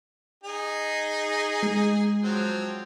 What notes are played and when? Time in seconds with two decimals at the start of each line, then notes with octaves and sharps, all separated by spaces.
0.43 D#4 G#4
1.63 G#3
2.24 F3 F#3 C4